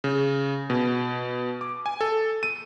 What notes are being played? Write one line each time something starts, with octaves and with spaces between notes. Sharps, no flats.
C#3
B2
D6
G#5
A4
D#7